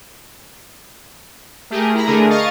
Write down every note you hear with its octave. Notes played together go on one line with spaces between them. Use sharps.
A3 G4 G#4 A#4
E4 A#5 B5
D3 A3 D4 G#4 A#4
D#5 F5 C#6 A6